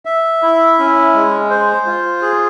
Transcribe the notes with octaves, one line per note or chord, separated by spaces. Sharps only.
E5
E4
C#4
G#3
C5
F4
G#4